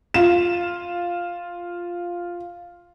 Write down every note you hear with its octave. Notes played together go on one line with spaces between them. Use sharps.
F4 E7